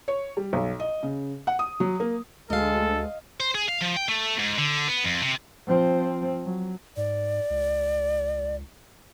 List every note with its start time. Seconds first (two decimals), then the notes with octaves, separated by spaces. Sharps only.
0.08 C#5
0.37 G3
0.53 B1
0.80 D#5
1.03 C#3
1.47 F#5
1.59 D#6
1.80 F#3
2.00 A#3
2.50 D2 G#3 A4 D#5 F5
3.40 C5
3.55 G#4
3.68 F5
3.81 F3
3.96 G5
4.09 A3
4.39 G#2
4.58 D3
4.88 B3
5.04 F2
5.22 C3
5.67 F3 C4
6.45 F#3
6.97 G#2 D5
7.50 C#2